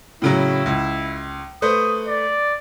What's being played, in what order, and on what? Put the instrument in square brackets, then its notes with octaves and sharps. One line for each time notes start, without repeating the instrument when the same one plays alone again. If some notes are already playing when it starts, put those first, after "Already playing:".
[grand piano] A2 C#3 F#3 [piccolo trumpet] E4
[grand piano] C#2
[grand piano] A3 B4 C5 [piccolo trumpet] D#6
[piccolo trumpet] D5